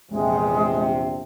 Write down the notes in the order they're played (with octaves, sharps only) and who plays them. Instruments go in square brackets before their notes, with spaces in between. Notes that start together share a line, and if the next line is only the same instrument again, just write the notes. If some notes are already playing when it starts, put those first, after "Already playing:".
[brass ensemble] A#1 E2 C3 [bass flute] G#3